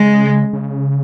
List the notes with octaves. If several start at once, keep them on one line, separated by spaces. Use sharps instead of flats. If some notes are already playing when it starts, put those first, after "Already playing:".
Already playing: C#3 G#3
C#3